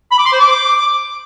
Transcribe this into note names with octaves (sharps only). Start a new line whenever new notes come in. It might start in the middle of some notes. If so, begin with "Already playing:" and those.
B5
D6
C6
C5
D6